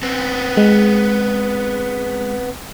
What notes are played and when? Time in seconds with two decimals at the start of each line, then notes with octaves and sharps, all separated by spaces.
0.03 B3 C4
0.57 G#3